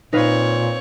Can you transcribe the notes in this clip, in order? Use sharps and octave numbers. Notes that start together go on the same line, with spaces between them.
A#2 C4 D#4 B4 C#5 F5